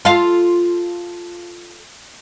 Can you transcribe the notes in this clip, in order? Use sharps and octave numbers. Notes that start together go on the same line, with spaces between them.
F4 A4 F5